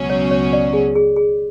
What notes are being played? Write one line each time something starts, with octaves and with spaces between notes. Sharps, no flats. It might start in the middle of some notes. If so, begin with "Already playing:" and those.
Already playing: C#2 B2 F#3 C#4 F#4
C#5
C#5
D5
G#4
G#4
G#4